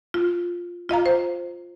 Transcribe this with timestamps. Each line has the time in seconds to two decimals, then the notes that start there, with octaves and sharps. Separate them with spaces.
0.14 F4
0.89 F4 D#5 F5 A#5
1.06 C5